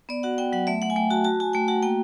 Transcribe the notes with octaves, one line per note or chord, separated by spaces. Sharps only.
B3 D5
F#4 F#5
B3 G5
F#3 F#5
A3 E5
A3 F#5
G#5
A3 G5
F#4 A5
F#4 A5
F#4 G#5
A3 G5
F#4 F#5
A#3 G5